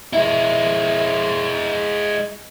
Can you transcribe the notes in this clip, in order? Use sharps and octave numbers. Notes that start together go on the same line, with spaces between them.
G#3 E4